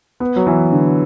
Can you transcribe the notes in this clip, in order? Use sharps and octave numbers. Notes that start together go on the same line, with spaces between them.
B3
F#3
E3
D3